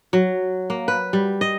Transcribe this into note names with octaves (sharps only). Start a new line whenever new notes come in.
F#3
A#3
B4
G3
D#5